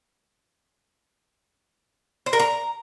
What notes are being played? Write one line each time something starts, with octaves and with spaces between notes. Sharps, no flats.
C5
A#4
A#5